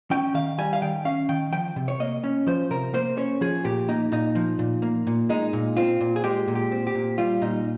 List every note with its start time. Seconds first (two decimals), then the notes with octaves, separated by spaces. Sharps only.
0.11 C#4 G5
0.34 D#3 F5
0.58 G3 G#5
0.73 F5
0.82 D#3 G5
1.05 C#4 F5
1.29 D#3 G5
1.53 F3 G5
1.76 C3
1.88 C#5
2.00 A#3 D#5
2.24 C#4
2.47 F3 C5
2.71 C3 A#4
2.94 A#3 C5
3.17 C#4 C#5
3.41 F3 G#4
3.64 A#2 G4
3.88 A#3 D#4
4.12 A#2 D#4
4.35 F3
4.59 A#2
4.82 A#3
5.07 A#2
5.29 G#3 D#4
5.53 A#2
5.77 C4 F4
6.01 A#2
6.16 G#4
6.24 G#3 G4
6.48 A#2
6.55 G4
6.72 C4
6.87 G4
6.95 A#2
7.18 G3 F4
7.42 A#2 D#4